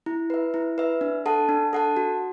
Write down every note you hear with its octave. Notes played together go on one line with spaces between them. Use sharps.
E4
B4 E5
E4
B4 E5
D4
A4 F#5 A5
D4
A4 F#5 A5
F#4